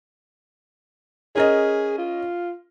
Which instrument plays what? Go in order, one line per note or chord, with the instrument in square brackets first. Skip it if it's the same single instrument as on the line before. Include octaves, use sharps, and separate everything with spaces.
[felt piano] C#4 A#4 D#5 [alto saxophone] G#4
[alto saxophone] F4